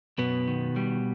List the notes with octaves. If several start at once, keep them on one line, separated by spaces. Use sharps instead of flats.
F#2 B2 B3
D#3
G3